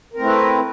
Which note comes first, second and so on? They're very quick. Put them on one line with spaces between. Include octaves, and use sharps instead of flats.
A#4 C4 A3 E4 B4